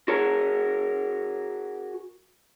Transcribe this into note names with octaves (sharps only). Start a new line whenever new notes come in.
F#4 G#4 A#4 C#5